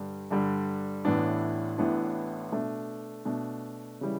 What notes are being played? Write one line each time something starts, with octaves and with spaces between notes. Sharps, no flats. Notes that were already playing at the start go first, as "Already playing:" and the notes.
Already playing: G2 D3 G3
G2 D3 G3
A1 A2 E3 B3 D4
A1 A2 E3 B3 D4
B2 A3 D4
B2 A3 D4
C#3 E3 G3